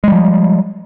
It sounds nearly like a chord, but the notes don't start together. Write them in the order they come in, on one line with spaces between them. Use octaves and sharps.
G#3 G3 F3